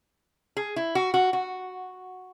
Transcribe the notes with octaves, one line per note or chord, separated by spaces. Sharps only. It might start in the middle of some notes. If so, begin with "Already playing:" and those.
G#4
E4
F#4
F#4
F#4